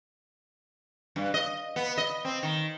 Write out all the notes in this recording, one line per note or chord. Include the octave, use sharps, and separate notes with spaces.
G2
D#5
B3
D#5
C4
D#3